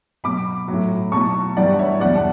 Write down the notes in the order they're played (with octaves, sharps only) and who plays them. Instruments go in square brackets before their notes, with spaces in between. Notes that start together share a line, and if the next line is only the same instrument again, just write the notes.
[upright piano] B2 F#3 B5 D6
A2 F#3
B2 F#3 A5 C#6
G2 E3 G3 D5 F#5
C#5 E5
E2 B2 G3 D5 F#5
A5